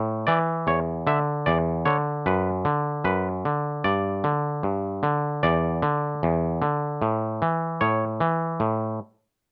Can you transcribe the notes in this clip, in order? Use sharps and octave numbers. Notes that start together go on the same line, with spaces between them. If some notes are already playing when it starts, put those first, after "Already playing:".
Already playing: A2
E3 D5
E2 C#5
D3 E5
E2 D5
D3 C#5
F#2 B4
D3
F#2 B4
D3
G2 D5
D3
G2
D3
E2 D5
D3
E2
D3
A2
E3
A2 C#5
E3
A2